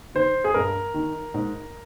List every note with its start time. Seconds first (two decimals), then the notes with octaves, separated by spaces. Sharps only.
0.15 D#3 C5
0.44 G#4
0.54 G2 A#4
0.94 D#3
1.34 G#2